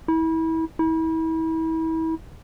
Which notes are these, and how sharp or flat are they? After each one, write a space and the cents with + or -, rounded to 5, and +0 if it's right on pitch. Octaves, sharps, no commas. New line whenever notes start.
E4 -30
E4 -35